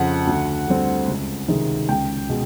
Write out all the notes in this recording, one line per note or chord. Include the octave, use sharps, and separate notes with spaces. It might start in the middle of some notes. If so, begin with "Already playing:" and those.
Already playing: F2 C#3 F3 F#5
D2
D3 G3 C4
C#2
C3 D#3 G#3
C#2 G5
B2 G#3